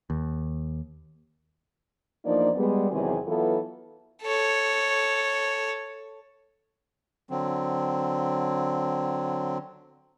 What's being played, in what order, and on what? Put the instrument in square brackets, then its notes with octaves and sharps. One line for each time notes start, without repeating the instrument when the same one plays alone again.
[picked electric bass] D#2
[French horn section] E2 F3 A#3 D4 D#4 D5
G3 G#3 B3
E2 C3 D#3 F#3 C4 G#4
E3 F#3 B3 E4 F4 A4
[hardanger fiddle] A4 C#5
[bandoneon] D3 F#3 C4